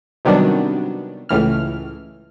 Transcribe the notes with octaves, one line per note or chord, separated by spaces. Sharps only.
C3 D#3 F#3 G3 B3 D4
C#2 A2 E3 F6